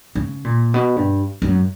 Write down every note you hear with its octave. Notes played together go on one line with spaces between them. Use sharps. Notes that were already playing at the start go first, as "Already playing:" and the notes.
C#3
A#2
B2
G2
F#2